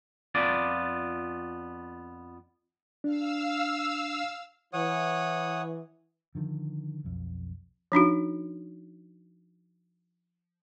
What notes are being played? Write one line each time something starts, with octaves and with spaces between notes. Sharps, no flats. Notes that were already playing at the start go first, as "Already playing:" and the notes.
F2 B3 F4 D5
D4 F5 E6
E3 C#5 F#5 D#6
D3 D#3 F3
B1 F2
F3 D4 D#4 F#4